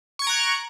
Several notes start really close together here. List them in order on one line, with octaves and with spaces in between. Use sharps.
C#6 G#6 D7 A#5 F#6